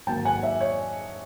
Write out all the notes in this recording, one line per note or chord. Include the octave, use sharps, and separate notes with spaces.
G#2 D#3 F#3 A#3 G5 A5
F#5 G#5
D5 E5
C#5 D#5